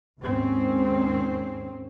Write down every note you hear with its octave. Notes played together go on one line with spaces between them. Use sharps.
D#2 G#2 C4 C#4